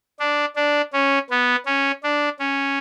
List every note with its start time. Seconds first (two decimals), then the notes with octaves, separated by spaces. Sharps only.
0.20 D4
0.56 D4
0.93 C#4
1.30 B3
1.66 C#4
2.03 D4
2.40 C#4